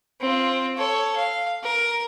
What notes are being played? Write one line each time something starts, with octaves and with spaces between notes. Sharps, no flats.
C4 F4
A4 C#5
F5
A#4